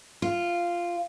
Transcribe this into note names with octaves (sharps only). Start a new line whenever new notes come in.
F4